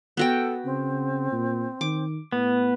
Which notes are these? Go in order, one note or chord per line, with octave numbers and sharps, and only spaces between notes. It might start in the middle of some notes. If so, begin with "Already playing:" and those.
B3 F#4 A4 G5
C#3 C4
A#2
D#3 D6
A2 B3